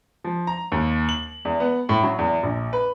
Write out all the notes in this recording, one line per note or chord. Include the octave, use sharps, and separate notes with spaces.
F3
A#5
D#2
F#7
E2
B3
A2
F#3
E2
A#1
B4